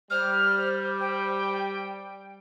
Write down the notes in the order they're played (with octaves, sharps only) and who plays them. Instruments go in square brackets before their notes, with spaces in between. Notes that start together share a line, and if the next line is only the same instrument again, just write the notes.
[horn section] G3 [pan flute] C5 [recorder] F6
[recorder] G5